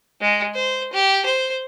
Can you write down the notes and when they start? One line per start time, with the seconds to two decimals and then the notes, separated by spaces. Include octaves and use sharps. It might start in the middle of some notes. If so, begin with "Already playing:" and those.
0.21 G#3
0.54 C5
0.93 G4
1.25 C5